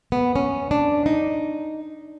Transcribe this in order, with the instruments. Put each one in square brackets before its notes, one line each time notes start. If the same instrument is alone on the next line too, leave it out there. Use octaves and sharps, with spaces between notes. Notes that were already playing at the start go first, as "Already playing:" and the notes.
[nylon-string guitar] B3
C#4
D4
D#4